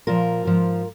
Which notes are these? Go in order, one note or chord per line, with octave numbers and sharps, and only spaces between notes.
A#2 F3 F4 A#4
G#2 F3